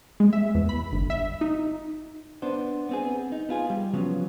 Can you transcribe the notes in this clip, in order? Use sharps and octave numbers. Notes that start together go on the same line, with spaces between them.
G#3
E5
E2
B5
G1
E5
D#4
B3 D4 C5
B3 C4 G#4
D#4
B3 F4 G#4
G3
C#3 F3 F#3 B3